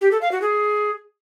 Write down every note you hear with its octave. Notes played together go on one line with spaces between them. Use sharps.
G4
A4
F5
F#4
G#4